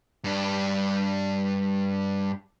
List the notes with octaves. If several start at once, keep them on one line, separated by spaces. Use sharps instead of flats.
G2 D4